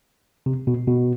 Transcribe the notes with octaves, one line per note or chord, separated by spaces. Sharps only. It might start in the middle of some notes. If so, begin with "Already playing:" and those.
C3
B2
B2